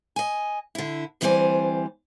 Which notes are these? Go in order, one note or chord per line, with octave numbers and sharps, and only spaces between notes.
D#5 G#5
D3 E4
D2 E3 G3 C4 C5 G#5